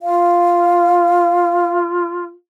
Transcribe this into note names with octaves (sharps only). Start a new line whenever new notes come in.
F4 F5